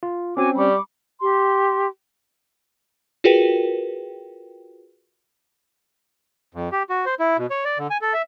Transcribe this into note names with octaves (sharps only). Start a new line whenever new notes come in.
F4
C4 C#4 F#4 G#5 D6
G3 B5 C#6 D6
G4 C6
F4 F#4 G#4 A#4 B4 G5
F2
G4
F#4
C5
E4
B2
C#5
D5
D3
G#5
A4
E5